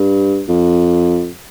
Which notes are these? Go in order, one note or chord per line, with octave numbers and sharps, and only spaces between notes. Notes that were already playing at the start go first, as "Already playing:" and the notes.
Already playing: G2
F2